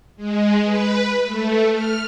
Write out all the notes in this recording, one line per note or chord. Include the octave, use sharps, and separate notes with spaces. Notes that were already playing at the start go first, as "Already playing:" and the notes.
G#3
B4
A3
F6